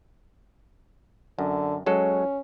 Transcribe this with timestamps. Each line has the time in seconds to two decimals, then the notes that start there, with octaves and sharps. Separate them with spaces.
1.39 F#2 D3
1.86 F#3 G#3 C#4 A4